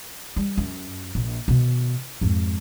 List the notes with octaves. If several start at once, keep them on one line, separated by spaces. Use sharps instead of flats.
G3
F#2
A#1
B2 D#3
F2 G#2